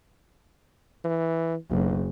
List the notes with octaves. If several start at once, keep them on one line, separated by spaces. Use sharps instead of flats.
E3
F#1 B1